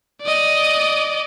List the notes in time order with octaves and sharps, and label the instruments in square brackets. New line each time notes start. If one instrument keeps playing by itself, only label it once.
[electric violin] D5 D#5